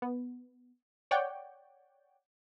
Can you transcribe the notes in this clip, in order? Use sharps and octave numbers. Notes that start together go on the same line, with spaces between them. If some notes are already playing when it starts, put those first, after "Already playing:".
B3
C#5 D5 F#5 G5